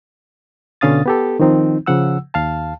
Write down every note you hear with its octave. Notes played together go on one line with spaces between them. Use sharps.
B2 D3 C#4 F5 D#6 A6
B3 G4 A4
D#3 F3 C4 D#4
C#3 F3 F#5 E6
D#2 F5 A5